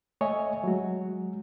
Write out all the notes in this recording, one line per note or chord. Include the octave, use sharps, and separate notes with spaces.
A3 C#5 D#5 E5 G#5
F#3 G#3 F#4